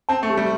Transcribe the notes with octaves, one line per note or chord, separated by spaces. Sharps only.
C4 A5
A3
G4
G3